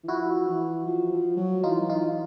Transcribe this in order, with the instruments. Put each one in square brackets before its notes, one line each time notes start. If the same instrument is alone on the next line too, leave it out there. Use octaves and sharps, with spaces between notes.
[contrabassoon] E3
[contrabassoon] F3 [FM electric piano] E4 F#4
[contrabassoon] E3
F3
F3
F#3
[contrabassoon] E3 [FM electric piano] D#4 F4
[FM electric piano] D#4 F4